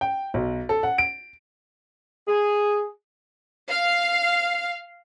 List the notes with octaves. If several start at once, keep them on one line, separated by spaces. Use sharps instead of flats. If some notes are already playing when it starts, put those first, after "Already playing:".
G5
B1
A4
F#5
D7
G#4
F5